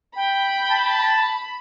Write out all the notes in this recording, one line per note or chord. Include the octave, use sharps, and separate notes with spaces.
G5 B5
A5